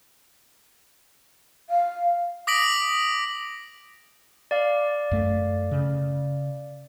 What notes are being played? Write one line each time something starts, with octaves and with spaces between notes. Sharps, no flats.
F5
D6 D#6 A#6 B6 D7 F#7
D5 F5
F#2 A3
C#3